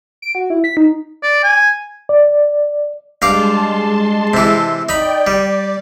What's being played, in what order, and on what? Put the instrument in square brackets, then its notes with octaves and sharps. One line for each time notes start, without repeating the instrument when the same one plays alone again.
[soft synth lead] D7
F#4
E4
B6
D#4
[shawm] D5
G#5
[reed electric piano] D5
[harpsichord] G2 F5 D6 [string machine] G#3 A5 C6
[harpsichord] C3 E3
[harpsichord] D#4 B5 [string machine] D5 G5
[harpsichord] G3 [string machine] D5